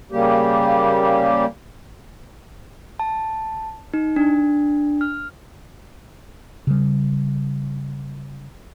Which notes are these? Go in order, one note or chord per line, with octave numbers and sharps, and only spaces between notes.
C#3 G3 A#3 G4
A5
D#4
D4
F6
C#3 G3